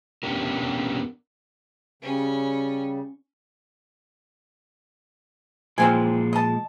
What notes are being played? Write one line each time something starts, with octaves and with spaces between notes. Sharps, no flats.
B3 C#4 D4 G4 A#4
C#3 G3 C#4
A#2 F3 G#3 A#3 C4 G#5
D#5 A5